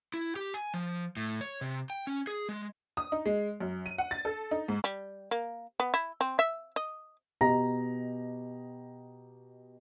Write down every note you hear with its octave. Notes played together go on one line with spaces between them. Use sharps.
E4
G4
G#5
F3
A2
C#5
C3
G5
C#4
G#4
G#3
D#6
D#4
G#3
F#2
D#7
F#5
A6
A4
D#4
G#2
G3
A#3
B3
E4
C4
E5
D#5
B2 G4 D#5 A#5 A#6